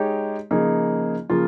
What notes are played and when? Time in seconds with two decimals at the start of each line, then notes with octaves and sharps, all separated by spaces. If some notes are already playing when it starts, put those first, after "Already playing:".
Already playing: G#3 D#4 G4 C#5
0.51 C#3 F3 A#3 D#4 G#4
1.30 C#3 F3 A#3 F4